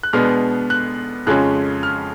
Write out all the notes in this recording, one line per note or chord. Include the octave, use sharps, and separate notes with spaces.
F#6
B2 G#3 B3 D4 F6
F#6
F2 C#3 F3 G#3 C#4 F#6
F6